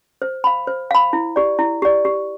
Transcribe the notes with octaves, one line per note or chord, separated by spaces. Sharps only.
C5
F5 B5
C5
F5 B5
E4
G4 D5
E4
G4 D5
G4